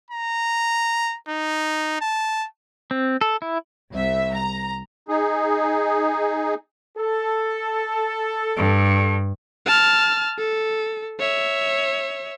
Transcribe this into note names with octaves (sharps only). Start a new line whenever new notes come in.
A#5
D#4
A5
C4
A4
E4
C2 E5
A#5
D#4 G#4
A4
G2
A5 F6
A4
C#5 E5